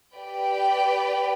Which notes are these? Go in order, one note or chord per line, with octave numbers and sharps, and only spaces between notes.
G4 B4 D5 G5